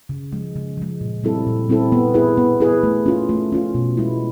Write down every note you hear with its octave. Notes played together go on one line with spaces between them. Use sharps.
C#3
F3 G#3
C#3
F3 G#3
A#2
G3 C4 E4 A4
A#2
G3 C4 E4 A4
B3
E4 G#4 B4
B3
E4 G#4 B4
A3
C#4 F4
A3
C#4 F4
B2
G#3 B3 E4